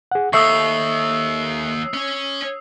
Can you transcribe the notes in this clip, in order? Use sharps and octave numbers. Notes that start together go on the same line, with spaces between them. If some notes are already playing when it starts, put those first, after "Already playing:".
G#4 F#5
D#2 A4 E5 C#6 D#6 E6 C7
C#4 C#5